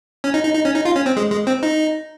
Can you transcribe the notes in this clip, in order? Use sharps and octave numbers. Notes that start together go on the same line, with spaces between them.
C#4
D#4
D#4
D#4
C#4
D#4
F4
C#4
C4
G#3
G#3
C4
D#4